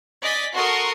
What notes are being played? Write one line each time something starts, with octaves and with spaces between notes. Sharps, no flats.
D5 D#5 G#5 B6
F#4 A4 A#4 C6 C#6 D#6